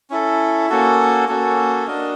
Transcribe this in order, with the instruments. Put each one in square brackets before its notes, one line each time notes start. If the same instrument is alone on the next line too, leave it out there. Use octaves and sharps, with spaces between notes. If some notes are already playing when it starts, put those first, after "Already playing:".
[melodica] C#4 E4 A4
A#3 C#4 F#4 A4
A#3 C#4 F#4 A4
D4 F#4 A#4 D#5